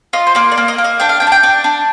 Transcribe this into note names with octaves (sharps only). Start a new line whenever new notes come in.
F4 D#5
C5
A#3 D5
D5
A#3
D#5
A#3
D#5
D4 G5
F5
D4 G5
A5
G5
D4
D4